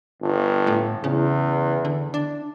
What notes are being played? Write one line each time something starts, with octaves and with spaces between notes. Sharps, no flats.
G1
A2
E2 C#3
D3
D4